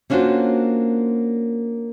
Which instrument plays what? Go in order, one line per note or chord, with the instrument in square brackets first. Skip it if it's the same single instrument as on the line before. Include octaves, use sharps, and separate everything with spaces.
[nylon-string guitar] A#3 C#4 D4 F4 F#4 C5